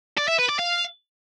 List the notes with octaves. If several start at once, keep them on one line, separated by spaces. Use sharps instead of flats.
D5
E5
B4
D5
F5